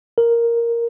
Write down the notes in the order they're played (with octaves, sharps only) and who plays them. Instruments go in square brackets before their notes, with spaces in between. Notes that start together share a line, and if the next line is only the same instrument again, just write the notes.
[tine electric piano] A#4